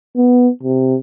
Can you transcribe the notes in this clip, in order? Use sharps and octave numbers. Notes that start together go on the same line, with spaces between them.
B3
C3